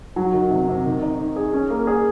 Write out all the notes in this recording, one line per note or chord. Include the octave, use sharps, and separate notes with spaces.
F#3
D#3
C3
C3
D#3
D#4
D#3
G#4
C#4
A#3
G#4